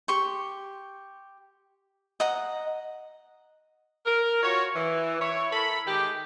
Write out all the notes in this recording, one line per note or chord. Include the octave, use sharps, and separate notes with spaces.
G4 C6 C#6
D#5 F#5 A#5
A#4
F4 F#4 C#5
E3
E4 C#5
A4 A#4 B5
D#3 G#3 G4